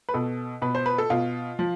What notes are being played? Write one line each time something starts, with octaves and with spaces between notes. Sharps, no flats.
B4
B2 A4
B2 B4
C5
B4
A4
B2 F4
F3